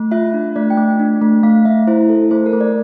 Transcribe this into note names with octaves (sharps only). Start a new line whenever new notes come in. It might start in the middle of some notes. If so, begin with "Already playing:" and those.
Already playing: A3
F4 E5
D4
A3 D5
G5
A3
D4
A3
A3 F5
A3 E5
E4 C5
A4
A3 C5
A#4
A3
D5